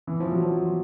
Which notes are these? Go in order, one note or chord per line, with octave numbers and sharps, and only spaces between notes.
E3
F3
F#3
F3